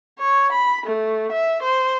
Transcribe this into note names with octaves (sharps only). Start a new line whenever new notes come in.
C#5
B5
A3
E5
C5